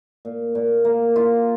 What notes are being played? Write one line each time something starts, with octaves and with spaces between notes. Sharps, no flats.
A#2
A#2
A#3
F4